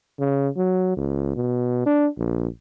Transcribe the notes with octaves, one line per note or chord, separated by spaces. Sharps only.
C#3
F#3
C#2
B2
D4
A#1